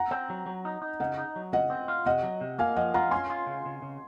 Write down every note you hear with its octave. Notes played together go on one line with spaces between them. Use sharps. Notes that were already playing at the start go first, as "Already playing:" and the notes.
Already playing: F#5 A#5
C4
F#3
F#3
D#4
D#4
C#3 D#5 F#5
D#4
F#3
C#3 D#5 F#5
C4
F4
C3 D#5 F#5
F#3
C3
A#3 F5 G#5
F3 D#5 F#5
F4 F#5 A#5
C#4 G#5 C6
F4
C#3
C#3
C#3